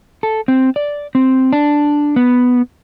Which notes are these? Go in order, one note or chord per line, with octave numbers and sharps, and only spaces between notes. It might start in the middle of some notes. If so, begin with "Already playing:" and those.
A4
C4
D5
C4
D4
B3